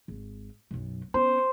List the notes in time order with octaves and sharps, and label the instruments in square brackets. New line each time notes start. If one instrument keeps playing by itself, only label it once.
[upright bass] G#1
B1 F#2
[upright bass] B3 C#4 [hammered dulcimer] C5